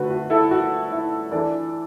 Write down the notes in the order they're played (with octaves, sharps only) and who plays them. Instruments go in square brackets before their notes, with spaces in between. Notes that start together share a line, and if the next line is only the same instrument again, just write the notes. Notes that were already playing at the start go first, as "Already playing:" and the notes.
Already playing: [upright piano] D3 A3 F#4 B4
F#4
E4 A4
F#4
E4
E3 D4 A4 D5